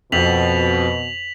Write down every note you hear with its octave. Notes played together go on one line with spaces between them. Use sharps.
F2 B2 F3 B6 F7 F#7